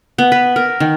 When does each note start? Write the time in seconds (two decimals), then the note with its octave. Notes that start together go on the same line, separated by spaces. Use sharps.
0.18 B3
0.32 B4
0.56 A#4
0.80 D#3